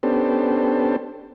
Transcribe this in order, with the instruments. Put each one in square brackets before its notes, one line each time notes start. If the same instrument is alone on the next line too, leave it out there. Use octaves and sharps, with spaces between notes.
[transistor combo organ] B3 C#4 D4 G4 A4 C5